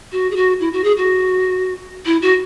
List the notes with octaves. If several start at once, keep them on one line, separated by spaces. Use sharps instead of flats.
F#4
G#4
F#4
E4
F#4
G#4
F#4
E4
F#4